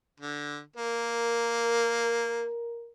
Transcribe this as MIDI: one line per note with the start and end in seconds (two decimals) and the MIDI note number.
0.20 0.60 50
0.76 2.48 58
0.76 2.91 70